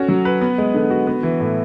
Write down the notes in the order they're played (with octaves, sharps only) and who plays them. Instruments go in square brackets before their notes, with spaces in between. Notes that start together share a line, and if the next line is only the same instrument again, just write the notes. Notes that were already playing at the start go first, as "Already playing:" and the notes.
Already playing: [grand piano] C#4 F#4 A4
F#3
B4
B3
G#3
D3
F#4
B3
E3
A2